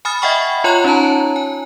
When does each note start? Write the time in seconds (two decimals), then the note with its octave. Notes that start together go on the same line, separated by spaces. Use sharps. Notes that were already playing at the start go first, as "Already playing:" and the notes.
0.05 G#5 B5 D#6 F6 A6
0.22 D#5 E5 F#5 G5 B5 C#6
0.64 F4 C#5 G#5 C6 F#6 F#7
0.84 C#4 D#4 C#5 A5 A#5
1.36 G#5